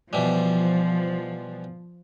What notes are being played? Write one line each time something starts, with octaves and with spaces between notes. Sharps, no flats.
B2 E3 F3 G3